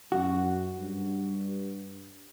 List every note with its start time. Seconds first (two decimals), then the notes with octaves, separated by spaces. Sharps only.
0.12 F#2 F#4
0.79 G2